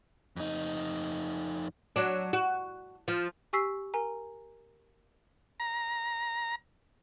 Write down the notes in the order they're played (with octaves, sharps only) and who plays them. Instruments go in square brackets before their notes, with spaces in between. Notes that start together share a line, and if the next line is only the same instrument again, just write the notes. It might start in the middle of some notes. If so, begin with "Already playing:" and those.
[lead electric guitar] F2 D#4
[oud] F#3 D4
F#4
F3
[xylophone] G4 G#5 C#6 E6 B6 C7
A#4 G#5 A#5
[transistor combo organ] A#5